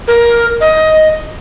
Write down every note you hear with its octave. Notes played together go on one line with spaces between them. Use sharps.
A#4
D#5